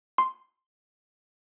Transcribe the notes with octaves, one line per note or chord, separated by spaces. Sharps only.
C6